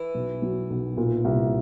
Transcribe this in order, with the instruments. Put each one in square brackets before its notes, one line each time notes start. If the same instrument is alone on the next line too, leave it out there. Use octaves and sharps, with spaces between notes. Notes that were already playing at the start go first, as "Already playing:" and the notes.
Already playing: [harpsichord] E3
[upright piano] B1
F#3
B1
A#2
C2